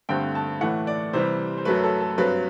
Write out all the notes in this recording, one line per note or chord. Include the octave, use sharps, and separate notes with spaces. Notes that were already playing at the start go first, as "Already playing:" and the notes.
G2 D3 A3 C4 G5
A5
A2 E3 A3 F#5
D5
C3 E3 G3 C5
C5
F#2 F#3 A3 B4
A4
A4
G2 F#3 C4 B4